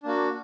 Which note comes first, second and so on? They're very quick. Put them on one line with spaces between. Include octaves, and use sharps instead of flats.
D4 A#3 F#4